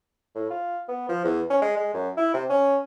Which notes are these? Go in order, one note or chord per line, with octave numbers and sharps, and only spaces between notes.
A2
F4
B3
F3
E2
C#4
G#3
G#3
F#2
E4
C3
C#4